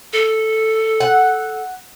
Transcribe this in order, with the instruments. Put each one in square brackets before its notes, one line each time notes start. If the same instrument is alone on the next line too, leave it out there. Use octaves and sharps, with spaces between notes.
[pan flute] A4
[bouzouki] F#5